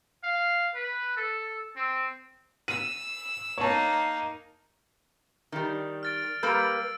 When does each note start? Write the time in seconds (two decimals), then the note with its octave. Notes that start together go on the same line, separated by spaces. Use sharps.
0.24 F5
0.75 B4
1.17 A4
1.76 C4
2.68 E6 D#7
3.58 A#3 D#4 C#5 A5
5.52 D#3 G3
6.03 F6 A6 D7
6.43 G3 A#3 B4 E6 A6 D7